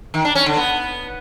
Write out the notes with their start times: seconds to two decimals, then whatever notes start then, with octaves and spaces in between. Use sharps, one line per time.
0.14 D#3
0.25 D4
0.35 C#4
0.46 D3
0.57 B3